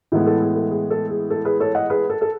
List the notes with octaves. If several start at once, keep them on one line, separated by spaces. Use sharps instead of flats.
A2 E3 G#3 B3
A4
G#4
A4
G#4
A4
G#4
A4
G#4 B4
A4 C#5
D#5 F#5
G#4 B4
A4
A4